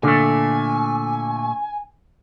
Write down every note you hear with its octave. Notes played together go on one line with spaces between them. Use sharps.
A#2 D3 A3 G#5